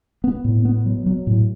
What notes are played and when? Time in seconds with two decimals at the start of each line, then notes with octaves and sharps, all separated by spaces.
0.24 B3
0.44 A2
0.65 B3
0.86 F#3
1.06 F#3
1.27 A2